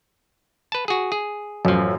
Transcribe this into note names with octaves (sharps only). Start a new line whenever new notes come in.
B4 A5
F#4 G#4
G#4
A1 F#2 F3